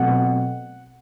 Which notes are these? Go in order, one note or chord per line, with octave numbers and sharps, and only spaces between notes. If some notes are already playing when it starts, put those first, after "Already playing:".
Already playing: B2 F#3 A3 C4 F#5